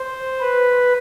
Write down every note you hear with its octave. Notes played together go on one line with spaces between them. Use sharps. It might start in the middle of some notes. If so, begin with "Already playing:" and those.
Already playing: C5
B4